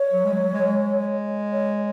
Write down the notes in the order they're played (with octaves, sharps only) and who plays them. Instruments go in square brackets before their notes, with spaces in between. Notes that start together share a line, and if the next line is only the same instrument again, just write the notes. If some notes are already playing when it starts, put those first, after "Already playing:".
Already playing: [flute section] C#5
[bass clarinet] F#3
G#3
F#3
G#3
[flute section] C#5